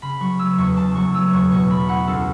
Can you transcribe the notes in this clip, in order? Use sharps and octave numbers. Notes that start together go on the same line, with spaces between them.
C#3 B5
F#3 C#6
A3 E6
E2 C#6
C#3 A5
F#3 C#6
A3 E6
E2 C#6
B2 C#6
A3 B5
E4 F#5
C#2 A4